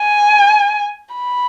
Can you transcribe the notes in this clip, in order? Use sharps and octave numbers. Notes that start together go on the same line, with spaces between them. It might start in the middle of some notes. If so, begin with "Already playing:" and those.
Already playing: G#5
B5